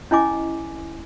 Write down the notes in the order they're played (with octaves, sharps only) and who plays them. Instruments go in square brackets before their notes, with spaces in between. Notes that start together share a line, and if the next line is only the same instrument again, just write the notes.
[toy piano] C#4 E4 D#5 G#5 D6